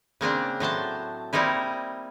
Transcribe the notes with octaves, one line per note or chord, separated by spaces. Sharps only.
C#3 A#3 C4 D4
A2 F#3 C5 A5
G3 A#3 C4 D#4 E4